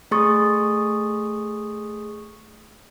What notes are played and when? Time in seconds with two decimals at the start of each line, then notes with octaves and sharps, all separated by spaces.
0.11 A3 G#4 C6 C#6 D#6 A6